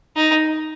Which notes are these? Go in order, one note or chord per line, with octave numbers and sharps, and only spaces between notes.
D#4